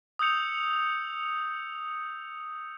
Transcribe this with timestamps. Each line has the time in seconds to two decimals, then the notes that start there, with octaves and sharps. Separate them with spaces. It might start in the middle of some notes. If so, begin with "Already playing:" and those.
0.19 D#6 E6 G6 C#7 F7